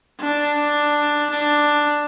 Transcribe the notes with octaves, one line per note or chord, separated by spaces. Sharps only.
D4
D4